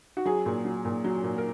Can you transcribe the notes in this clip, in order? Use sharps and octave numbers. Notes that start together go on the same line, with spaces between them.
F#4
F#3 G#4
A#2
F#3
A#2
F#3
A#2
A#4